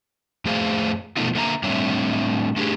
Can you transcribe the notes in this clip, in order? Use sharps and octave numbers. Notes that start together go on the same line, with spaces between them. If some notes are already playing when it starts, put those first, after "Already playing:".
F2 A3 G#4 C5 F5
B2 F3 A3 B3 D#4 F4
D3 A#3 E5 A#5
A2 G3 C4 D4 C#5 E5
A3 D4 G4 G#4